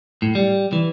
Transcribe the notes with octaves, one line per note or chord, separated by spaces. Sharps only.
A2
G3
E3